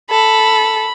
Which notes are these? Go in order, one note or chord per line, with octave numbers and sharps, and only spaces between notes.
A4 B5